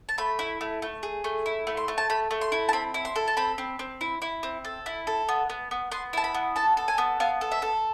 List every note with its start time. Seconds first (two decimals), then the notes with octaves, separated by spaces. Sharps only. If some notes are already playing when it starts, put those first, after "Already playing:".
0.09 A5
0.18 A3 B5
0.39 E4
0.61 A3
0.82 A3
1.03 G#4
1.24 A3
1.46 E4
1.67 A3
1.77 C6
1.88 A3
1.98 A5
2.10 A3 B5
2.31 A3
2.41 C6
2.52 E4
2.69 A5
2.73 C4 B5
2.94 E4
3.05 C6
3.16 A4
3.28 A5
3.37 C4 B5
3.58 C4
3.79 C4
4.01 E4
4.22 E4
4.43 C4
4.65 A4
4.86 E4
5.07 A4
5.29 B3
5.50 B3
5.71 B3
5.92 B3 C6
6.13 E4 A5
6.24 B5
6.34 B3
6.56 A4 A5
6.77 A4
6.88 G#5
6.98 B3
7.20 B3 F5
7.41 A4
7.52 E5
7.62 A4